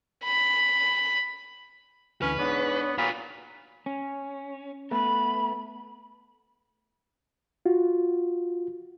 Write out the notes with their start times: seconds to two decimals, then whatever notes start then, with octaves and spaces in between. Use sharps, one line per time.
0.24 B5
2.22 D2 E3 C#4 B4 F6
2.39 G#2 B3 D4 C#5
2.98 A#2 F4 F#4 B5
3.86 C#4
4.91 A3 B3 B5
7.66 F4 F#4